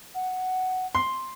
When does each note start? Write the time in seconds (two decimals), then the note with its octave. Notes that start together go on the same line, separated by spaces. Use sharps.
0.14 F#5
0.95 C6